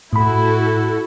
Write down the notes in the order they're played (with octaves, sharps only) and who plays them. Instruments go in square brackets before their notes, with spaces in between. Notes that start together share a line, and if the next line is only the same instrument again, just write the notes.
[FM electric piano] A2 B5 [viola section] E4 F#4 A4